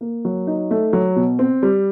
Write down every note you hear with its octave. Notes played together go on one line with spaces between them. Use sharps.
A#3
F#3
D#4
A3
F#3
B2
C4
G3